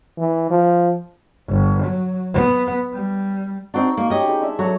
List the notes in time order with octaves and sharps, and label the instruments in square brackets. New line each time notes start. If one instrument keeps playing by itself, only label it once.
[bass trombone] E3
F3
[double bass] G1
F#3
B3
G3
[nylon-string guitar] C4 D4 [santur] D#4 F#4 D5
[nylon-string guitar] A#3
[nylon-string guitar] C#4 D#5 [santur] G4
[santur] D#4 G#4 C5
G#3 D4 E5
[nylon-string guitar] F#3 [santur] A4 C#5 F#5